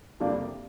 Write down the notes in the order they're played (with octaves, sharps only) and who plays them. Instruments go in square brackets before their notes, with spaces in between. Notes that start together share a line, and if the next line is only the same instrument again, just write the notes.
[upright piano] F2 C3 G3 A#3 D4